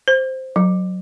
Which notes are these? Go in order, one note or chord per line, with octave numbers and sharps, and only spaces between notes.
C5
F#3